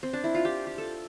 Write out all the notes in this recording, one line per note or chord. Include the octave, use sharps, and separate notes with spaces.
C4
D4
E4
F4
G4
G4
A4